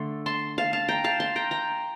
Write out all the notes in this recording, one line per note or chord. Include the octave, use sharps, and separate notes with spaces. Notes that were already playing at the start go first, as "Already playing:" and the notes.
Already playing: D3 A3 C6
A5 C6
F5 A5
F5 A5
G5 A#5
F5 A5
A5 C6
G5 A#5
G5 A#5